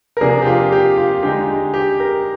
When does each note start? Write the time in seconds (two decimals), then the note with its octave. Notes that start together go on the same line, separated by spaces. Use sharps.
0.17 A#4
0.21 C3 F3 A#3 D4 G#4
0.42 G4
0.46 F4
0.72 G4
0.97 F4
1.23 D3 G#3 D#4 G4
1.74 G4
2.00 A#4